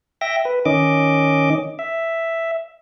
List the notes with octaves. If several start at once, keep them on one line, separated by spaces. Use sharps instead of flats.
E5 G5 A#6
B4
D#3 C#4 D#5 D6
E5